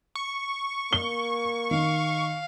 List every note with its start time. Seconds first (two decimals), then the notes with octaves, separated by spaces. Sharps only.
0.15 C#6
0.93 A#3 G7
1.71 D#3 F5